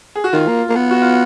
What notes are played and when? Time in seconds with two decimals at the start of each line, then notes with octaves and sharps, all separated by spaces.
0.15 G#4
0.24 F#4
0.33 D#3 F4
0.48 A#3
0.69 A#3
0.76 B3
0.91 F#4
1.01 F4